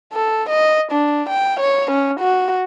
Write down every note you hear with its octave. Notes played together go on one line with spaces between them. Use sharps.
A4
D#5
D4
G5
C#5
C#4
F#4